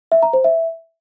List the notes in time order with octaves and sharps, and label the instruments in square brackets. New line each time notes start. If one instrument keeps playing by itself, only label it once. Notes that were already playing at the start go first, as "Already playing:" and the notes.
[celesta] E5
A#5
C5
E5